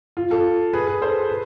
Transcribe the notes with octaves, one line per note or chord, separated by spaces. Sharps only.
F4
F4 A4
G#4 B4
G#4 B4
A4 C5
B4